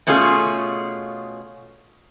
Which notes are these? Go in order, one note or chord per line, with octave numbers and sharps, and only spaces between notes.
B2 A3 C#4 D4 F4 G#4